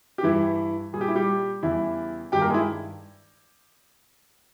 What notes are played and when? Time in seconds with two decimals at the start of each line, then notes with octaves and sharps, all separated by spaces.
0.18 G4
0.23 G2 E3 G3 E4
0.93 A#2 G3 G#4
1.01 G4
1.08 E4
1.16 G3 G4
1.63 E2 C#3 G3 E4 E5
2.32 G2 D#3 G3 G4 G5
2.41 A#3 A#4
2.50 G#3 G#4
2.54 E4